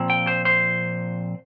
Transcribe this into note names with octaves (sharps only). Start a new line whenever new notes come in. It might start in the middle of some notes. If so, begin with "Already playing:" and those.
Already playing: A#2 F3 C4
G5
C5
C5